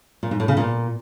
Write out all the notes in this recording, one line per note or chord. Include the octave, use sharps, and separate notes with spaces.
A#2
G#2
A2
C#3
A#2